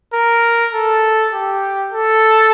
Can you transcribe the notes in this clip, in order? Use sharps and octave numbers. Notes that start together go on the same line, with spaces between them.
A#4
A4
G4
A4